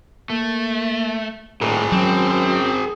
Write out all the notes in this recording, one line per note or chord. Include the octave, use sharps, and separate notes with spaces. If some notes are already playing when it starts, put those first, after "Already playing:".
A3 A#3
D#1 A2 G#4 A#4
F#2 F#3 C4